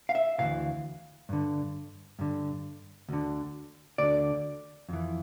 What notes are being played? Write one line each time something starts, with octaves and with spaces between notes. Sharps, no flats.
F5
E5
D2 C#3 E3 F5
G2 D3
G2 D3
D2 D3
D2 D3 D5
F2 E3